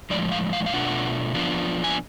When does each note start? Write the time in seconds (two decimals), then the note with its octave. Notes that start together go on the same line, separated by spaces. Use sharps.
0.10 A2 F3 G#3 D5
0.32 F5
0.53 F5
0.66 F5
0.73 B2 A3 D4 F4 F#5
1.34 F3 B3 D4 F4
1.84 G#5